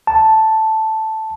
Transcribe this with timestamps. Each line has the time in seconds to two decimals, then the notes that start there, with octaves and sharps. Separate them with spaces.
0.07 A5